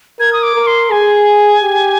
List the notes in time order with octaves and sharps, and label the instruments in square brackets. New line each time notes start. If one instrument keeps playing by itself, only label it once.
[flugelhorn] A#4 [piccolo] G#6
[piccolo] D#6
D6
[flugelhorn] A#4
[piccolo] C6
[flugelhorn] G#4 [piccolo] G#5
[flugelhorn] G4